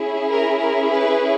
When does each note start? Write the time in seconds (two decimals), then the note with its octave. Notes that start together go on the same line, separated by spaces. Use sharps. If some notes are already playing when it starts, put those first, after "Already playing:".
Already playing: C#4 E4 G#4
0.29 A#4
0.60 A#4
0.90 B4